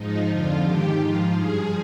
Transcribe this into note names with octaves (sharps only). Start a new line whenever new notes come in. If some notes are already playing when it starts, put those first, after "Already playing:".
Already playing: G#2 F3 D#4
F2 D3 F3 F4
G#2 D#3 G4
G#2 F3 F4
G2 F3 G#4